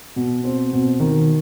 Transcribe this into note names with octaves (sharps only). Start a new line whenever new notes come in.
B2
C4
B2
D#3